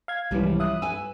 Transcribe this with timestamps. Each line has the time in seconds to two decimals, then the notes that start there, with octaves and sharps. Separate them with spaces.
0.08 F5 G#6
0.31 C2 G#2 E3 F3 G3 C#4
0.60 E5 D#6 F#6
0.82 B4 G#5 E6